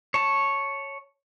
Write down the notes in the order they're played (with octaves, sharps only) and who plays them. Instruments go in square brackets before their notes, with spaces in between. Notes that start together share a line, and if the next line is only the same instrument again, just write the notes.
[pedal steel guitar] C#5 A5